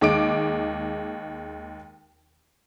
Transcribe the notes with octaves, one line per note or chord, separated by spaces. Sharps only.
D#2 G#3 D6 D7